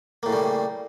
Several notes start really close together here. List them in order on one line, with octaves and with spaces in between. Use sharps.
A#3 A2 C#3 G3